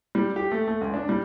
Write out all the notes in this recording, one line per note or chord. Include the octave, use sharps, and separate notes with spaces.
G3
G4
A3
A3
C#2
D4
G3